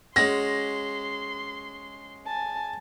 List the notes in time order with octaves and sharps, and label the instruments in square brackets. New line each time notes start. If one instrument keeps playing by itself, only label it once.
[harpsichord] G#3 C#4 F#4 [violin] C6 [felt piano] A#6
[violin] G#5 A5